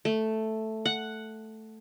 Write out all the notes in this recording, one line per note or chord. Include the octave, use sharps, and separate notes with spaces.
A3
F#5